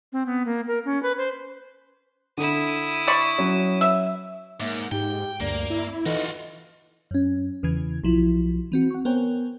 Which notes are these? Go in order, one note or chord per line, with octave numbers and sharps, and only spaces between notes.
C4
B3
A#3
A#4
C#4
B4
C5
D3 E4 D#6
D5 B5 C#6
F#3 C#4
E5
G#2 A#3 C#5 E5 D6
G#2 D#4 G4 G5
D2 G2 A#3 D5
E4
E3 D#4 F4 F#4 A4 B4 D#5
F#2 C#4
E2 C#3 E3 G#6
B1 F3 E4
E3 C4 F#4
F#5 C#6
B3 A#4 C5 C#5 G5 G#5